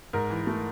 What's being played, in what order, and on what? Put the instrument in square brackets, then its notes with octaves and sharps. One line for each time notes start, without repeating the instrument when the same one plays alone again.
[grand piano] G#2 A#4
E3
A3